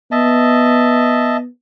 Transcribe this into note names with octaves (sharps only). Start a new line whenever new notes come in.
B3 D#5 E5 A5